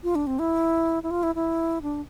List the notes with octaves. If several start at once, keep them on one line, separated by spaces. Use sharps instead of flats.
F4
D4
C4
E4
E4
F4
E4
E4
D4